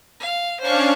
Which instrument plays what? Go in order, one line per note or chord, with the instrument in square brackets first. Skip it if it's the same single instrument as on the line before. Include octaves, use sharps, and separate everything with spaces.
[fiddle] F5
[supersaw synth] C#4 D4 F5 [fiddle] C5 C#6